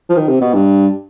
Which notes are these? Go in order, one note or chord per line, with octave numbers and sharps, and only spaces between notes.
F3
D#3
C3
B2
G2